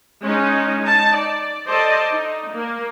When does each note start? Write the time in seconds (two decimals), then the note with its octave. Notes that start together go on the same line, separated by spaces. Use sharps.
0.22 G#3 C#4 D#4
0.82 D#4 A5
1.16 D5
1.66 A4 C5 D5 D#5 A5
2.10 D#4
2.52 A#3